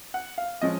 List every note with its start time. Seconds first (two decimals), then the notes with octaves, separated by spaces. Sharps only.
0.14 F#5
0.38 F5
0.61 F3 G#3 C#4 D#5